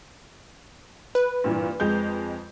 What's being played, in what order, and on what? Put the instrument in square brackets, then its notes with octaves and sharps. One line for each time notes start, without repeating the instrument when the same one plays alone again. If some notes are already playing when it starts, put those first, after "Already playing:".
[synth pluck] B4
[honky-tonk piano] G2 A#2 E3
F2 G#3 G6